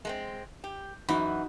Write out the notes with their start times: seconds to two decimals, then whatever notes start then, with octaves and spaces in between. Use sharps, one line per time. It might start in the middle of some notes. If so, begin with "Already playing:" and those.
0.05 G#3 A#3 C4
0.64 G4
1.09 F#2 E3 D#4 F#4 B5